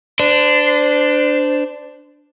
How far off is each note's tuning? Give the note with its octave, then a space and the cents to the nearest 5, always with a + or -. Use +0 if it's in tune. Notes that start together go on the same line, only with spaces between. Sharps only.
D4 +0 C5 -30